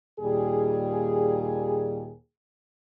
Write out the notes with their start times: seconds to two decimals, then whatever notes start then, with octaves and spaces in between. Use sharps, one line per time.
0.19 D#2 A#2 G3 G#4